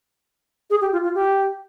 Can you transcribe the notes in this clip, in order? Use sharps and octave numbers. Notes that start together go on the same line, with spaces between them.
G#4
G4
F4
F4
G4